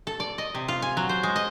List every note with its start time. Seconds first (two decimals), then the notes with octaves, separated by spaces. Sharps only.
0.07 A4
0.20 D5
0.38 D#5
0.55 C3
0.68 F4
0.82 G#5
0.97 F#3
1.09 C5
1.23 G#3
1.36 D#5